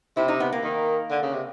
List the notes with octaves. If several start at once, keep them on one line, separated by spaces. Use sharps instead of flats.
C3 E4
D#4
B3
A#3
D#3
D3
C#3
C3